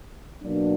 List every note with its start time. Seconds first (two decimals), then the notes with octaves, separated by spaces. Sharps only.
0.42 B2 F#3 A#3 D4